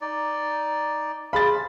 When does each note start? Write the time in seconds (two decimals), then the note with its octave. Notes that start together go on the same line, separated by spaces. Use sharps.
0.01 D#4 D5
1.33 G#4 C5 F5 B5 A6